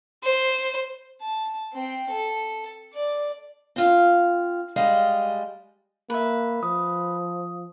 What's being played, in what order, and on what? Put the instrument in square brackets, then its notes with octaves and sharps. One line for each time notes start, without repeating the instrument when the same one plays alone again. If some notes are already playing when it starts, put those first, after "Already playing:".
[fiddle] C5
[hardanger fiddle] A5
C4 G5
A4
D5
[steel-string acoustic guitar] C4 F4 F5
G3 G#3 D#5 F5
[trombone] A#3 [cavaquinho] B4 E5
[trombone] F3 [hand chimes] D#6